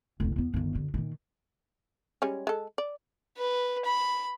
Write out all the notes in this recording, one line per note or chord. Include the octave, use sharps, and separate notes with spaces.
F1 C2
E2 B3
G1 D#3
F#2 D3
A#2 D#3
G3 G#3 C#4
G#3 A4
D5
B4
B5